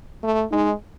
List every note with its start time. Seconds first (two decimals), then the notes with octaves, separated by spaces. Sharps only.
0.23 A3
0.52 G#3 D#4